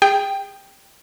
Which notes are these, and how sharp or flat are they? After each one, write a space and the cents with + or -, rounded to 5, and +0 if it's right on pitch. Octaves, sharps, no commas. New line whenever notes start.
G#4 -30 G5 +5